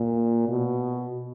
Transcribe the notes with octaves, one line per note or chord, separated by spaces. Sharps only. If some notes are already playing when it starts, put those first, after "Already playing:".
Already playing: A#2
B2